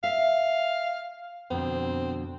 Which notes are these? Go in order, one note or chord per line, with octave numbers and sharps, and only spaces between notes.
E5 F5
F2 B2 D3 C4